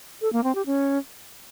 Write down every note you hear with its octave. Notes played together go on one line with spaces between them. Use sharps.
A4
A#3
C4
G4
C#4